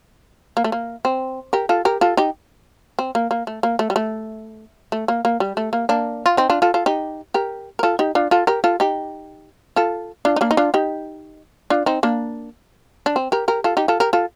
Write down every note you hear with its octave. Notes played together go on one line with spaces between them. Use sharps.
A#3
A3
A#3
C4
G4 A#4
F4 A4
G4 A#4
F4 A4
D#4 G4
C4
A#3
A#3
A3
A#3
A3
G3
A3
A3
A#3
A#3
G3
A3
A#3
A#3 D4
F4
C4 D#4
D4 F4
F4 A4
F4 A4
D#4 G4
G4 A#4
A#4
F4 A4
D#4 G4
D4 F4
F4 A4
G4 A#4
F4 A4
D#4 G4
F4 A4
D4 F4
D#4
A#3 D4
D#4
D4 F4
D#4 G4
D4 F4
C4 D#4
A#3 D4
D4
C4
G4 A#4
G4 A#4
F4 A4
D#4 G4
F4 A4
G4 A#4
F4 A4